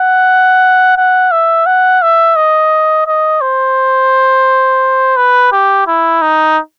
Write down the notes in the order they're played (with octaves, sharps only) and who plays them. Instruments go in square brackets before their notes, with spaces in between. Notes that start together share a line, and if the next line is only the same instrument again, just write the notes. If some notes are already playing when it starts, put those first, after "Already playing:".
Already playing: [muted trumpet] F#5
F#5
E5
F#5
E5
D#5
D#5
C5
B4
G4
E4
D#4